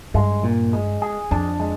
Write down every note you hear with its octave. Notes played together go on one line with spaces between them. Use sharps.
G2 G#3
A#2
G#3
G#4
F2 D4
G#3